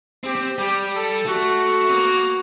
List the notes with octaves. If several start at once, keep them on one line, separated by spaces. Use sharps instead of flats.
C4 G4
C4
G3 G4
A4
A3 F#4
C4
A#3